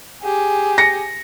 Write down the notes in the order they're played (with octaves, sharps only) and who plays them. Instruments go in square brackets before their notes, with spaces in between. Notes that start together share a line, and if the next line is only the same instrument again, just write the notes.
[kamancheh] G4 G#4
[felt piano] A#6 C#7